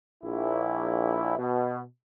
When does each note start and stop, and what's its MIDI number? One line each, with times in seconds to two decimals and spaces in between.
0.23 1.37 34
0.23 1.37 64
1.38 1.80 47